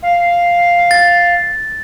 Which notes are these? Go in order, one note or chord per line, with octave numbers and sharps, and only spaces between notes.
F5
A6